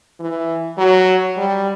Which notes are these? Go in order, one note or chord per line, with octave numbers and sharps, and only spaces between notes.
E3
F#3
G3